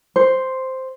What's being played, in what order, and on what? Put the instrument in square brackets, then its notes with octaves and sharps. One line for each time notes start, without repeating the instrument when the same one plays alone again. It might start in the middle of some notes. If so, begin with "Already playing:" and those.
[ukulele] C5